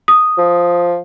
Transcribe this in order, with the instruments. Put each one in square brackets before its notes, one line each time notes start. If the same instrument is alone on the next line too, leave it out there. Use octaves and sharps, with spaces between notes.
[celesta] D#6
[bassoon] F3